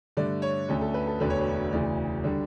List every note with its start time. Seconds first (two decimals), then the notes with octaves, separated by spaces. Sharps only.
0.17 G2 D3 A3 D5
0.42 C#5
0.68 D2 D3 A3 C#4 A4
0.81 A4
0.94 B4
1.07 A4
1.20 E1 D2 D3 A3 D4 B4
1.30 C#5
1.41 B4
1.72 E1 D2 C#3 E3 D5
2.24 D3 G3 D4